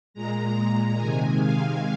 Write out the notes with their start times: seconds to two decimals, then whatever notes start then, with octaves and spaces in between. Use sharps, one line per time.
0.14 A#2 G#3 A#5
0.97 C3 D#3 G#3 G#5
1.40 F5